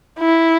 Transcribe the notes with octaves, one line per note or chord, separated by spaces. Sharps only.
E4